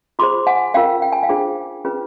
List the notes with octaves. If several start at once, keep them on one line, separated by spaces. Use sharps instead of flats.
F4 G#4 C5 C6 D6
F#5 G#5
C#4 F4 A#4 F5 G5
G5
G#5
F5 G5
D4 F4 G#4 C5
C#4 F4 G#4 B4